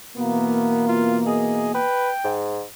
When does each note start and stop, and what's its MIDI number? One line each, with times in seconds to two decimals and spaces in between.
0.17 1.82 47
0.17 1.82 52
0.17 1.82 58
0.17 0.85 59
0.88 1.20 65
1.27 1.71 68
1.27 1.70 75
1.74 2.10 71
1.74 2.35 79
2.24 2.63 44